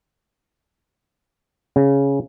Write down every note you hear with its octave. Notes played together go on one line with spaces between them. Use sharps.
C#3